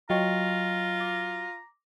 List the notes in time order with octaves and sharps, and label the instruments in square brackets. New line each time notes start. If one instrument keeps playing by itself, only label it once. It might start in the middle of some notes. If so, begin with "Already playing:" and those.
[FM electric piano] F#3 [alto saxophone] F4 [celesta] D#5 G5 C#6 [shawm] A#5
[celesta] D6 A#6